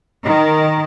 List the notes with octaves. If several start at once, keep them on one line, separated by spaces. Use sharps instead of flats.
D#3